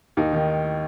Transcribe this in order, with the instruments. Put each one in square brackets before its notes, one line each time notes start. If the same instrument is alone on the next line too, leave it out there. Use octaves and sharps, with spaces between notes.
[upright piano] D#2 D#4
D#3